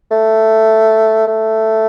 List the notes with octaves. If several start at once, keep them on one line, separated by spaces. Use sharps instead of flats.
A3
A3